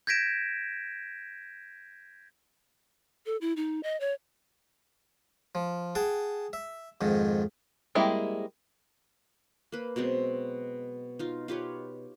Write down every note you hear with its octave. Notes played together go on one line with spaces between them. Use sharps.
G6 G#6 A#6 B6 D7 E7
A4
E4
D#4
D#5
C#5
F3
G#4 F#5 G5 A5
E5
F2 G#2 D#3
G3 G#3 A#3 C4 E4
A#3 B4
B2 F#3 G#3 C4
D#4 F4
F4 G4 B4 C#5